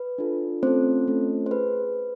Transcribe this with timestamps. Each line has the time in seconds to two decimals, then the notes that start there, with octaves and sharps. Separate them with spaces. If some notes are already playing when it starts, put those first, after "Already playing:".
Already playing: B4
0.18 D4 F4 A4
0.63 A3 C4 C#4 F4 A4 C5
1.08 A3 C#4 F4 A4
1.46 C5
1.51 G#4 B4